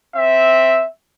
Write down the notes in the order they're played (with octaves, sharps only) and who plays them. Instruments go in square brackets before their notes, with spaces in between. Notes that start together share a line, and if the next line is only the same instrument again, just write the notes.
[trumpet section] C4 E5